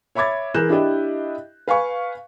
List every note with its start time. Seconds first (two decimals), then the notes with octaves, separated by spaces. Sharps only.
0.15 C#5 E5 B5 D6 G#6 A6
0.54 E3 G#4 A#4 F#6 G6 E7
0.69 D4 E4 G4 D#5 E5
1.68 B4 F5 G#5 C#6